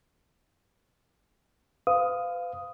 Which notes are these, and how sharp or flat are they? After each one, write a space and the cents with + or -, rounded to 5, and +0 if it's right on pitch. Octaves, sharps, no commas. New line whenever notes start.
B4 +45 F5 +0 D#6 +0